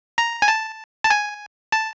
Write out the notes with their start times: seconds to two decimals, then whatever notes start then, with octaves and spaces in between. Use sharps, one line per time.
0.18 A#5
0.42 G#5
0.48 A5
1.04 A5
1.10 G#5
1.72 A5